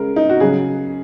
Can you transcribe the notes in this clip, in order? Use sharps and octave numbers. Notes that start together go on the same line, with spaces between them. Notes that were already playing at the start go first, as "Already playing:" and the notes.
Already playing: C#3 G#3 A#4
D#4
F#4
C#3 F#3 G#4